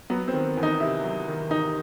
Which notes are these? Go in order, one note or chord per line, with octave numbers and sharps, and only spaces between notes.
F#3 B3
C4
D#3
E2
D#4
C3 E4
F#3
D#3
E2 D#4